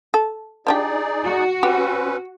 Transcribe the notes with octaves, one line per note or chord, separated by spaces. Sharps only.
A4
F3 D4 D#4 G4 G#4 D5
F#4
C4 C#4 G4 B4 F#5